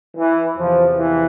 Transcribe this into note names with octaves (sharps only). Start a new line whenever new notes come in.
E3
E2 C3 E3 F3
E3